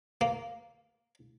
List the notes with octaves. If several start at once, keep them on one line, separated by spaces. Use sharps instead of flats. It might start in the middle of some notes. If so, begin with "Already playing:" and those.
A#3